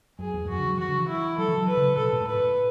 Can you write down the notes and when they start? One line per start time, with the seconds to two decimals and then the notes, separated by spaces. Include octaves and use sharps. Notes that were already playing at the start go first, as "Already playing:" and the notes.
0.19 F#2 G#4
0.34 E2
0.44 G#2
0.49 F#2 F#4
0.58 D3
0.68 F#3
0.78 E3 F#4
0.88 D3
0.99 E3
1.08 E4
1.38 F#3 A4
1.48 E3
1.58 F#3
1.68 B4
1.77 C#3
1.88 C#3
1.97 B2 A4
2.12 A2
2.21 G#2
2.27 A2 B4